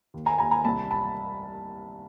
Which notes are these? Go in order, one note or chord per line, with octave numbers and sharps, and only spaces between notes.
D#2
G#5 A#5
D#2 G#5 A#5
G#5 A#5
C2 A5 B5
A5 B5